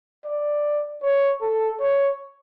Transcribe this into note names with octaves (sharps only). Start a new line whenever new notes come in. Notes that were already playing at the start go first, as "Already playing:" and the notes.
D5
C#5
A4
C#5